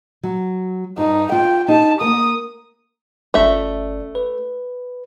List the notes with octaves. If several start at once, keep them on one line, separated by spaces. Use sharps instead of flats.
F#3
G2 D#4
F4 G5
D#4 G4 A5
A#3 A#4 D#6
G1 A3 C#4 D5 E5
B4